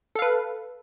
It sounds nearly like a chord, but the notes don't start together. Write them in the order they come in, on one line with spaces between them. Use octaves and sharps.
A4 F5 B4